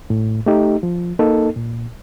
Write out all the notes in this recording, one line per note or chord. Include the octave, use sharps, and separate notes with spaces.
A2
A3 D#4 G4
F3
A#3 D#4 A4
A#2